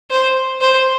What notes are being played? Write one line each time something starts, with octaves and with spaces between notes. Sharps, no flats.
C5
C5